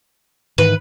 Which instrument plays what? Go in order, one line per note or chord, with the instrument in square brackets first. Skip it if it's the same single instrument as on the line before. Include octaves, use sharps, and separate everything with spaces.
[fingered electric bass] G#2 D#3 E3 [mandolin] B4